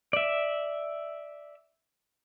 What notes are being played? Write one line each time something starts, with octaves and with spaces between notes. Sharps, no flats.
D5 E5